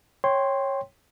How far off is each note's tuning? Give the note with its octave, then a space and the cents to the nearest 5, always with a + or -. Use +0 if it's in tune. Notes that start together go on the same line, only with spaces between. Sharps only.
C#5 -15 G5 +0 C6 +0